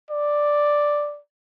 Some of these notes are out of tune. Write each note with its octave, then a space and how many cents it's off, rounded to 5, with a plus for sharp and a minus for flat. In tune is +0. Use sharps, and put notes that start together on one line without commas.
D5 +0